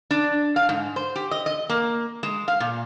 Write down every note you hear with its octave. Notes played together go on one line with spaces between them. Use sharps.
D4
F5
G#2
C5
G4
D#5
D#5
A#3
G#3
F5
A#2